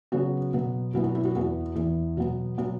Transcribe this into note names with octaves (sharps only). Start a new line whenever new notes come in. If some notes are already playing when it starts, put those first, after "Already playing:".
C#3 F#3 B3 F#4
B2 F#3 B3
B2 F#3 B3 E4
F#4
E4
F#4
E2 E3 B3 F#4
E2 E3 B3
B2 F#3 B3
B2 F#3 B3